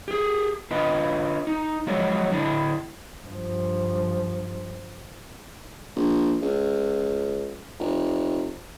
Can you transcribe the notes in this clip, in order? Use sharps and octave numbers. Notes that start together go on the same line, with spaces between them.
G4 G#4
D4 F4 B4 D#5
D#4
F3 F#3 G#3 C#5 D5
D3 D4 E4
G2 F3
A#1
C#2
F1